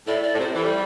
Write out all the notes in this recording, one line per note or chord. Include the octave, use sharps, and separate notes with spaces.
A2 D5
D5
A2
C3 C5
E3 A4
G3